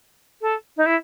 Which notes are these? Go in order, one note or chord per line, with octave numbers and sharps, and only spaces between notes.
A4
D#4
E4